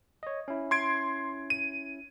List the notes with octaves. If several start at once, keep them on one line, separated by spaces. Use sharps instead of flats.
C#5 D#5
C#4 E4
C6 G#6 D7
D#7